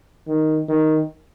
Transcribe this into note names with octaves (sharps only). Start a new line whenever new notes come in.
D#3
D#3